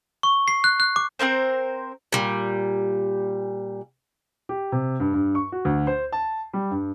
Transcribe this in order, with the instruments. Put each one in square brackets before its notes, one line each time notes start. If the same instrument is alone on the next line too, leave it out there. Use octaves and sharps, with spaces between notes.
[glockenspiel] C#6
C7
F#6
F#6
D6
[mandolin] C4 E4 A#4 C5
[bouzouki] A#2 G3
[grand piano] G4
C3
G2
G2
C#6
F#4
D2
C5
A5
G3
G2